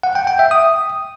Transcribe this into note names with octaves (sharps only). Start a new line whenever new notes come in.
F#5
G5
G5
E5
D#6